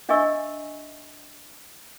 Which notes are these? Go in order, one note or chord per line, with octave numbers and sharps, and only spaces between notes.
D4 D#5 E5 G#5 C#6 E6